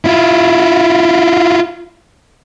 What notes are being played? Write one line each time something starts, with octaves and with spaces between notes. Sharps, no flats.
E4 F4